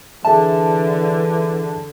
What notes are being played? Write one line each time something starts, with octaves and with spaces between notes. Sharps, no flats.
D3 E3 G#4 E5 A5